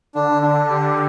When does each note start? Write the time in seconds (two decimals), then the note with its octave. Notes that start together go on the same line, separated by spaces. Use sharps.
0.15 D3 D4
0.43 D4
0.70 G4